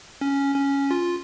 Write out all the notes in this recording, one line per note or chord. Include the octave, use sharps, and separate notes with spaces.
C#4
C#4
F4